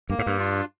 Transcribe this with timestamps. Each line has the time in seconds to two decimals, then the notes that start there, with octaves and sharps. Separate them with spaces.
0.10 G2 A#3
0.19 G#2
0.26 G2
0.37 D4 F4